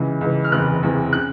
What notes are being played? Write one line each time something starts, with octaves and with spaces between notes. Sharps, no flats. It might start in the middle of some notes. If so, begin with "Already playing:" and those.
Already playing: C#2 C#3 E3
C#2 C#3 E3
F6
F#1 E2 C3 E3 F#6
F#1 E2 C3 E3
C#3 F#6